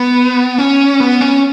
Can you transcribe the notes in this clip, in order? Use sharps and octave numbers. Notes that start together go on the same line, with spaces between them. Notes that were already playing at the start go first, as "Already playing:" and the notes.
Already playing: B3
C#4
B3
C#4